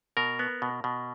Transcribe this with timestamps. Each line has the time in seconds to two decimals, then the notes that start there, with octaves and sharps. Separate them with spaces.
0.17 B2 A#4
0.39 B3
0.62 B2
0.84 B2